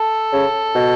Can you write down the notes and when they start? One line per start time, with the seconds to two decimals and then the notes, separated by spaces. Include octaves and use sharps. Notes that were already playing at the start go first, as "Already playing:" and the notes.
Already playing: A4
0.33 C#3
0.75 B2